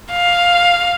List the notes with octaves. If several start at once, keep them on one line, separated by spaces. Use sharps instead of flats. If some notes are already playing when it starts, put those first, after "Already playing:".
F5